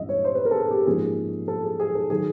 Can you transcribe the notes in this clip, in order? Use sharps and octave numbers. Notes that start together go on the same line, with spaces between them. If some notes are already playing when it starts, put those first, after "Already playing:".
Already playing: G2 E3 G#3 C#4 D#5 E5
C#5
C5
B4
A#4
A4
G#4
G4
G#2 F3 A#3 C#4 G#4
A4
G#4
G#4
A4
D#3 F#3 G#4